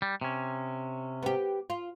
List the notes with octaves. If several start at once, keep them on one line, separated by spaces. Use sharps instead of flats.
G3
C3 C#4
B3 G4
F4